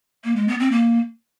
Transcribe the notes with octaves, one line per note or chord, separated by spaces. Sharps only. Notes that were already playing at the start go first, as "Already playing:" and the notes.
A#3
G#3
B3
C4
A#3